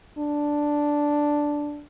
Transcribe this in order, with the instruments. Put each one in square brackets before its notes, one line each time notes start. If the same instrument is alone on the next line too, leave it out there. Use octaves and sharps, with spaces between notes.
[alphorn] D4